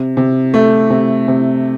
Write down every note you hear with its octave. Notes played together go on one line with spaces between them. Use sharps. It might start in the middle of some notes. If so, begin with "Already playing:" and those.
Already playing: C3
C3
A3
C3
C3